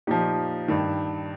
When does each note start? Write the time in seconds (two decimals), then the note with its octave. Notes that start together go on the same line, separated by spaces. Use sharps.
0.07 A#2 F3 D#4 G4
0.68 G2 D#3